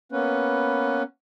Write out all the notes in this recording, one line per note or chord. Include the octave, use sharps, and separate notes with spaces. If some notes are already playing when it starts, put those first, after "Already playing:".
A#3 B3 C#4 B4